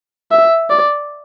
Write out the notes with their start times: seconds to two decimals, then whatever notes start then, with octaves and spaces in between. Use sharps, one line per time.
0.31 E5
0.70 D5